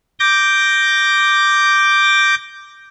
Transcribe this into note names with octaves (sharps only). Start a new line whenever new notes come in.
D6 G6 A#6